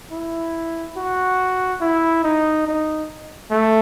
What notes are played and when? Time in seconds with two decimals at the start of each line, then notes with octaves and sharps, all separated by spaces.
0.12 E4
0.97 F#4
1.81 E4
2.24 D#4
2.67 D#4
3.51 A3